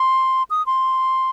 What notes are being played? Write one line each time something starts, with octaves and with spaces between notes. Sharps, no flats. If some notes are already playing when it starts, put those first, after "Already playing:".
Already playing: C6
D#6
C6